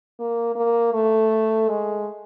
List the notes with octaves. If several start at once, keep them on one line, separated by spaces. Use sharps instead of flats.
A#3
A#3
A3
G#3